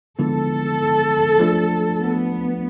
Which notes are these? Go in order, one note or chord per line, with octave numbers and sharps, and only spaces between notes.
D3 F3 G#3 B3 E4 A4
F3 A3 D4
B3